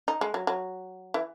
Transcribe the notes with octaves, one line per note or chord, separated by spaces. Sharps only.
D#4
G#3
F#3
F#3
E3